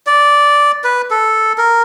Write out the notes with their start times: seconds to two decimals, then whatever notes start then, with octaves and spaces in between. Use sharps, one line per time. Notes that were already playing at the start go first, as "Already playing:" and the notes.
0.07 D5
0.84 B4
1.11 A4
1.58 A#4